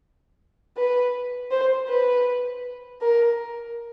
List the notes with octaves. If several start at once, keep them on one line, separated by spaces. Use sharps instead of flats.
B4
C5
B4
A#4